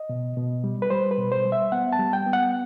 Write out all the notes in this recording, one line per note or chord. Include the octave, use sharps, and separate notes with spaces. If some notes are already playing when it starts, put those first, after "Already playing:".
Already playing: D#5
B2
B2
G3
B4
G3 C5
B4
B2
C5
G3
E5
B3 F#5
A5
G3
G5
B3
F#5